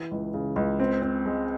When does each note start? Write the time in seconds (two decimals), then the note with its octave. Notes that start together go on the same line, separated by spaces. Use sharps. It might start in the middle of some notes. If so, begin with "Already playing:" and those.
Already playing: E3
0.11 C#2
0.34 C#3
0.56 C#2
0.80 C4
1.02 C4
1.26 G#3